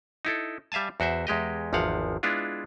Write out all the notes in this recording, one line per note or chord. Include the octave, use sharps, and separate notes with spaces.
D#4 E4 A4
G3 E5 F5 G#5 A5
E2 F#4 C5 E5
E2 G#3 G4 D#5
G#1 E2 F3 F5 F#5
G#3 B3 D4 E4 F4